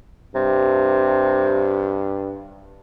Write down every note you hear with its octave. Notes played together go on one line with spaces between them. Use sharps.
G2 C3